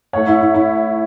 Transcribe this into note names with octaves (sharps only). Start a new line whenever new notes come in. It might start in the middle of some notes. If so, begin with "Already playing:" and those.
A2 A3 C#5 F#5
E4
E4
E4